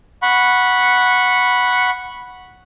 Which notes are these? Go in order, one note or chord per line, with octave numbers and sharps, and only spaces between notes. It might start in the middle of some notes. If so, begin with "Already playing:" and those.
F#5 B5 C#6